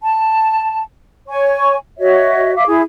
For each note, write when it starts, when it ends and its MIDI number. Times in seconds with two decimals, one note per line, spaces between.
0.01 0.80 81
1.28 1.75 73
1.28 1.75 80
1.28 1.75 85
1.98 2.54 66
1.98 2.54 73
1.98 2.54 75
1.98 2.54 76
2.55 2.64 76
2.55 2.64 77
2.55 2.64 86
2.67 2.82 64
2.67 2.82 68